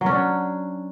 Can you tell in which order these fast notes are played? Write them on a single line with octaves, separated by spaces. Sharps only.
F#3 C#4 D4